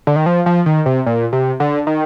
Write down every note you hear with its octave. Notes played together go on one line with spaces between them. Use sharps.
D3
D#3
F3
F3
D#3
C3
A#2
C3
D3
D#3